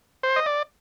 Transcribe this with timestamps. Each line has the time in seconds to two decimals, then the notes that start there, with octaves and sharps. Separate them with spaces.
0.23 C5
0.36 D#5
0.46 D5